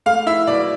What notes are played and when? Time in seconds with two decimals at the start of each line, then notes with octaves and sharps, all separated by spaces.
0.06 A3 F5
0.26 E4 E5
0.47 B2 D5